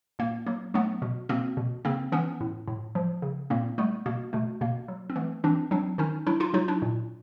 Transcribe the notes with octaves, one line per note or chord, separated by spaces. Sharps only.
A#2 A#3
F#3 A#3
F#3 A3 B3
B2
B2 A#3 C4
B2
C#3 A#3 C4
E3 B3 C#4
A2
A2
F3
C#3
A#2 A#3 C4
G3 A3 B3
B2 A#3
B2 A3
B2 A#3
F#3
C4
E3 A3 B3
E3 C4 D4
F#3 C4 D4
D#3 C#4 D#4
F#3 D4 E4
D#4 F4
F#3 D#4 F4
D4 E4
A#2